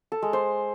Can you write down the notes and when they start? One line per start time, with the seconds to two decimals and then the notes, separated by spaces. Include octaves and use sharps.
0.12 A4
0.22 G#3
0.33 C5